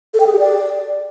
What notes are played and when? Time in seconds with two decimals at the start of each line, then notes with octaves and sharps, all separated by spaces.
0.14 A4
0.20 G5
0.26 G#4
0.33 G4
0.39 D5